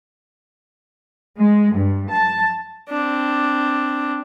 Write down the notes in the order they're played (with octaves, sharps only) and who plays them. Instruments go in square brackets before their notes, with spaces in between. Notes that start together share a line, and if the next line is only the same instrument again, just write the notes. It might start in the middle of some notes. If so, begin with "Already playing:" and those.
[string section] G#3
G2
A5
[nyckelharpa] C4 D4